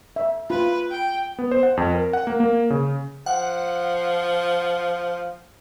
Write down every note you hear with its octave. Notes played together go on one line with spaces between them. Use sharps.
E5
F4 B4
G5
B3
C5
F#5
F2
A#4
F#5
A#3
A#3
C#3
F3 F#5